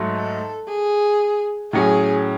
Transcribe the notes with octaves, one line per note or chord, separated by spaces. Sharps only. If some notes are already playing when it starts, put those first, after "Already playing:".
Already playing: G#2 F#3 A3
A4
G#4
A2 F#3 C#4 G#4